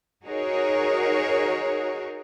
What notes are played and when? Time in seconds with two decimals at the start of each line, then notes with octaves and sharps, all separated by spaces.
0.24 D#4 F#4 G#4 A#4 C#5